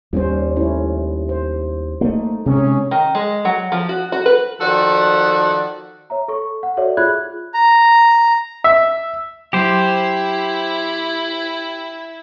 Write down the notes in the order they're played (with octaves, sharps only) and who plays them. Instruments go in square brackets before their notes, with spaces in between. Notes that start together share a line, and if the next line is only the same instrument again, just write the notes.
[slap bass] D#2 [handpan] G3 C#4 C5
[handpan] A3 C#4 E4
C5
[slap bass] A3 A#3 [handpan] D#4
[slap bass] C3 G#3 [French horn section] C#4 [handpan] G#4
[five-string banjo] D#3
G#3
F#3
F3
F#4
F#4
B4
[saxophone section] D#3 F3 F#4 A4 D5
[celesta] C#5 E5 A#5
A4 C#6
F#5
F#4 A4 C#5 D5 E5
F4 G#4 E5 B5 F#6 G#6
[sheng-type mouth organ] A#5
[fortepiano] E5
[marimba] F#3 [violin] E4 [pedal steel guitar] G4 C5